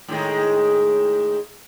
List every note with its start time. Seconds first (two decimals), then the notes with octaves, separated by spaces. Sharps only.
0.08 A2 D#3 G#3